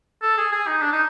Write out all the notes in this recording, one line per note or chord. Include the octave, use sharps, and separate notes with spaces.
A4
G#4
G#4
D#4
D4
D#4